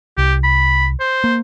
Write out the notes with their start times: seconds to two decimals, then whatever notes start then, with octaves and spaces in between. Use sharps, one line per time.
0.18 C2 G4
0.44 B5
1.00 C5
1.24 A#3